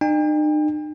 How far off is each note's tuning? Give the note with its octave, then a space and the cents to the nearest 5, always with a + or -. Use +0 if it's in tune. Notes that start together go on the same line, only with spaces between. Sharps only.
D#4 -45 G5 +40